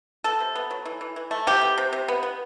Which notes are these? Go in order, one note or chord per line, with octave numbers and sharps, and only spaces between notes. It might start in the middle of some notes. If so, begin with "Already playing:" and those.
B3 A4
C3
B3
F#3
E3
E3
E3
A3
C3 G4
B3
C3
C3
B3
B3